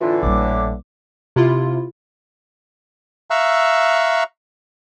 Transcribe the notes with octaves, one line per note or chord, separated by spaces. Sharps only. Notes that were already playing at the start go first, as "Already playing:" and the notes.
A2 D3 E3 F4
A#1 G3 D6
C3 E4 F4
E5 F5 A#5 C#6 E6 F#6